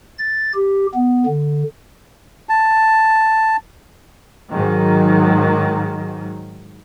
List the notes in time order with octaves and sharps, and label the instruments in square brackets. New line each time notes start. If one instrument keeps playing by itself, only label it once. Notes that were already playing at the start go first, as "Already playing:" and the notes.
[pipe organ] A6
G4
B3
D3
[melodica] A5
[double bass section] G#2 D#3 F#3